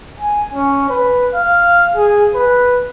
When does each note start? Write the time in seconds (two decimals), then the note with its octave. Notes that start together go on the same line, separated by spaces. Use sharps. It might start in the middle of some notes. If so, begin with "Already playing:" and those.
0.20 G#5
0.54 C#4
0.90 B4
1.34 F5
1.96 G#4
2.35 B4